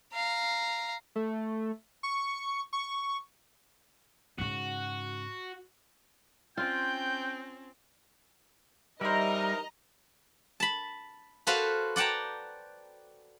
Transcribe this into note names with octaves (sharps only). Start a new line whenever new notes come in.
F5 A#5
A3
C#6
C#6
G#2 C#3 F#4
C4 C#4 F4 G5 G6
E3 G3 D#4 E4 A#4 C5 D#5 A#5
A5 B5
F#4 A4 B4 C5 F5
D5 F#5 G5 A5 A#5